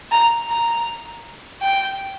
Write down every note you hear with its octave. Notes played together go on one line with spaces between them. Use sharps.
A#5
A#5
G5